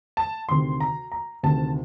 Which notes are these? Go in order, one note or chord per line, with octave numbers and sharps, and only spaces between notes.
A5
D2 C3 D#3 C6
A#5
A#5
D2 C3 D#3 A5